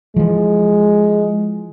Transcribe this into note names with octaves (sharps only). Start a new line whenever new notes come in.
E3 F3 G#3